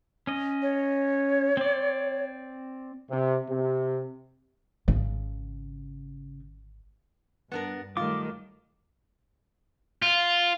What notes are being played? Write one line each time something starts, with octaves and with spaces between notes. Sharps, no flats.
C#4 D#5
C#5
C4 D5
C3
C3
G#1 C#3
G2 B3 D4 A#4
D#3 F#3 G3 A3 F4 D6
F4